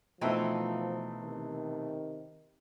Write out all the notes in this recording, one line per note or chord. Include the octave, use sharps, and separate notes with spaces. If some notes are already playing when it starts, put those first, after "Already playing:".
B2 E3 F3 A3 C4 D#4
C3 D#3